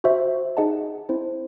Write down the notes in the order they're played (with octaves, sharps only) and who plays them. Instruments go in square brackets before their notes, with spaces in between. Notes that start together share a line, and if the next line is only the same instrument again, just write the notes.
[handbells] F#4 C5 E5
D#4 G#4 D#5 F#5 A5
C4 E4 C5